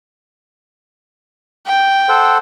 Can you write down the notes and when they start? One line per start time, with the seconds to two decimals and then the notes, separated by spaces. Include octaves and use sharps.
1.66 G5
2.09 A4 C5 F#5